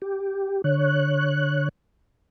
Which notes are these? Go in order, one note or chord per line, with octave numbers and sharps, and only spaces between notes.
G4
D3 C#5 F#6